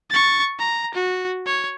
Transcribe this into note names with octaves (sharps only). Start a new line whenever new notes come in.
C#6 A6
A#5
F#4
C#5